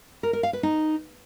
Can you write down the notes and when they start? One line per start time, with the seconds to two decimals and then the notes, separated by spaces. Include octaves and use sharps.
0.23 A#4
0.33 A#4
0.43 F5
0.53 B4
0.63 D#4